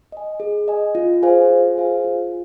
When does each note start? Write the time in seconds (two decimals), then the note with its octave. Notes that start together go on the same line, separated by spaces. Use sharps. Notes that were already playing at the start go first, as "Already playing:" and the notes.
0.12 D#5 G#5
0.40 G#4
0.68 D#5 G#5
0.95 F4
1.23 G#4 C5 F5 G#5
1.50 F4
1.77 G#4 C5 F5 G#5
2.04 F4